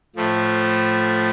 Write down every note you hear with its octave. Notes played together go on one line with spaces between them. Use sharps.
A2 F3 A3